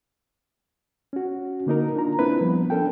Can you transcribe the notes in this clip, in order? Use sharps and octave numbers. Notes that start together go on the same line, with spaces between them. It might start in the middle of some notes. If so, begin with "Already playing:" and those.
C#4 F#4
D3 A#3 D#4 A#4
D4 F4 A#5
A#3 C4 D4 E4 B4
F3 G3 B3
C#4 D4 A4 A#4 G5